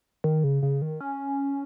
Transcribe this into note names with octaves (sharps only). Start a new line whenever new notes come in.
D#3
C#3
C#3
D#3
C#4